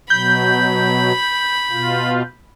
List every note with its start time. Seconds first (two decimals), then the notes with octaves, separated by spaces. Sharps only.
0.10 B2 F#3 B5 G6
1.70 B2 F4